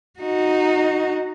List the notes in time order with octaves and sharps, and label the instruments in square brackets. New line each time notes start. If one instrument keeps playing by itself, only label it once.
[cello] D#4 F#4